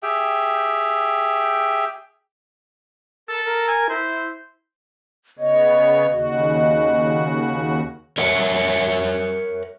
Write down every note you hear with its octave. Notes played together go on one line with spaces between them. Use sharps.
G4 G#4 E5 G5
A4 A#4
A#4
G#5
E4 C5
C#3 B3 C#5 D#5
D#2 C#3 F#4
A#4 C#5 E5 F#5